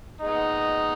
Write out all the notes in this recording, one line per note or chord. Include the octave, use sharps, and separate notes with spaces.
A#2 G#3 B3 D#4